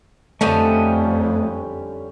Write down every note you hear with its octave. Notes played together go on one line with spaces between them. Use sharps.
F2 D3 G3 A3 C#4 D#5 A5